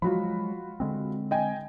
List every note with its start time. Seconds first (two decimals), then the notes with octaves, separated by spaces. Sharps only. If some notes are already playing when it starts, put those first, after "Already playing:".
0.02 F3 F#3 G#3 F4 F#4 B5
0.80 D3 G#3 C4
1.31 D#5 G5 G#5